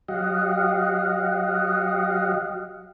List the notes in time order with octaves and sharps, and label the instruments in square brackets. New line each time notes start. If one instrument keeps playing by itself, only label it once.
[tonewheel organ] F#3 G4 D#5 F5 F#5